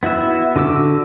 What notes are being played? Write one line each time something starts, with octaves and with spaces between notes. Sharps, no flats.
B3 E4 F#4 E5
D3 F#4 D6 E6